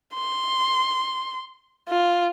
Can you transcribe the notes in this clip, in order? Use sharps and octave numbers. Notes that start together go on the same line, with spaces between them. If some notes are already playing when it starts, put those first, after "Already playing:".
C6
F4